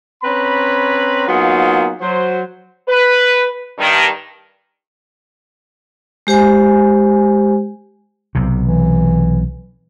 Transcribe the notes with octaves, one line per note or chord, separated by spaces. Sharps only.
C4 C#4 B4 A#5 B5
F#3 A#3 B3 D#4 F4 G#4
F#3 C5
B4
G2 D#3
G#3 G4 C5 G#5
B1 C3
E3